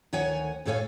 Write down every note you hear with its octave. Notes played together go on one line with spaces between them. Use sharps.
D2 D#3 C#5 F#5 G#5
E2 A2 A4 C#5 F5 G#5